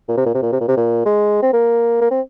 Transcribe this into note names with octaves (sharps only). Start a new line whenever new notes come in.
A#2
C3
A#2
C3
A#2
C3
A#2
C3
A#2
G#3
C4
A#3
A#3
C4